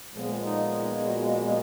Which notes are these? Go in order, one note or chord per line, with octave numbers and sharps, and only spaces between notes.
A#2 F3 G#3 B3
D#4
F4
F#4